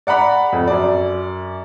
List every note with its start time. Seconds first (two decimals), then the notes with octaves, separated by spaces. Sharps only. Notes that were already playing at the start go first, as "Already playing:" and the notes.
0.07 D5 F#5 A#5 B5
0.53 F2
0.68 F#2 D5